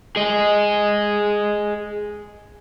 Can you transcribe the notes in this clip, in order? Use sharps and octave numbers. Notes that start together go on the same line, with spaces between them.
G#4 D#5